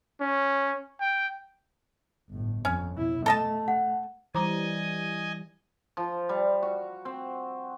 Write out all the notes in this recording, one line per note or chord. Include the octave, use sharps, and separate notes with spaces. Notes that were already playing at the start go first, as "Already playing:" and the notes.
C#4
G5
G1 A2
F2 C#4
B2 E4
A3 A4 D#5 A5
F#5
E3 G3 C5 D#5 G#5 A#5 D6
F3
G3
F#4
C4